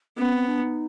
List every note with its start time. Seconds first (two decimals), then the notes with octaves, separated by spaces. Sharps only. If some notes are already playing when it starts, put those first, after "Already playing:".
0.17 B3 C#4
0.33 C4
0.48 D4
0.63 D#4